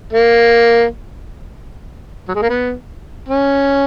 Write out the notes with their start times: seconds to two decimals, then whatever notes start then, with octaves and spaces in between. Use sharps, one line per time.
0.13 A#3
2.28 F#3
2.35 G#3
2.42 A#3
2.49 B3
3.29 C#4